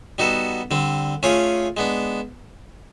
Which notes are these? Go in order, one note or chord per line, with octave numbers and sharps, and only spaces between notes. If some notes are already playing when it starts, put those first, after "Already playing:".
G3 B3 D#4 F#4 A4
D3 G3 C4
A3 C#4 F4 G#4 C#5
G#3 B3 D4